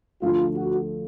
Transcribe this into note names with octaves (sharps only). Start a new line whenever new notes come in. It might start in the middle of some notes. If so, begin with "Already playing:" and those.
D2 D3 F3 A3 F4
F#4